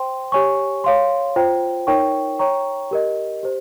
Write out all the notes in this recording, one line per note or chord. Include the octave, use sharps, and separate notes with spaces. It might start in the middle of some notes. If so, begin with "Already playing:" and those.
Already playing: C5 G5 C6
G4 C#5 G#5 C#6
C#5 F5 C6
F4 C5 G5
D#4 A#4 C#5 G5 C#6
C#5 G5 A#5 C#6
G4 A#4 D#5
G4 C5